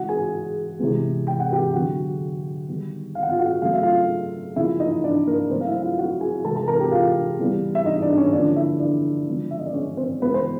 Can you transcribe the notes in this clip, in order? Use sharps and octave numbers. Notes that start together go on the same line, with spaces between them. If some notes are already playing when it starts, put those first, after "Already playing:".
Already playing: C#3 E3 G#3 F#4 F#5
G#4 G#5
C3 E3 G#3 B3
G5
F#5
G4 G5
D3 F#3 B3 F#4 F#5
D#3 G3 B3
F5
F#5
F4 F5
F#4 F#5
C#3 F#3 A3 F5
E5
F4 F5
C#3 F3 A#3 E4 E5
D#4 D#5
D4 D5
A#3 A#4
C#3 F#3 A3 C4 C5
F5
E4 E5
F4 F5
F#4 F#5
G#4 G#5
C3 E3 G#3 A4 A5
A4 A5
A#4 A#5
G4 G5
F4 F5
C#3 E3 G3 B3
E5
D#4 D#5
D4 D5
C#4 C#5
D3 F3 A#3 D4 D5
E4 E5
D4 D5
C#3 F3 G#3 B3
E5
D#5
D5
C#4 C#5
C4 C5
C#3 E3 G#3 B3 B4
C5